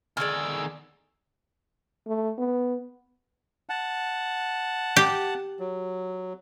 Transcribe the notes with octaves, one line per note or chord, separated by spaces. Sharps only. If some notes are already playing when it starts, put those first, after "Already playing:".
E2 D3 D#3 G#3 D5 E6 F6
A3
B3
F#5 A5
G4
F#3